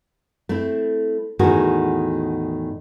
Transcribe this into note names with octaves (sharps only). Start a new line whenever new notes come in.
A3 C4 E4
E2 A2 D#3 F#4 G#4